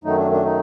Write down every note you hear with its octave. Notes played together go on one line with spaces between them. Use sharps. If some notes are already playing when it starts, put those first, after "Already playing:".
F#2 D#3 F#3 A3 D#4
D4
D4
D#4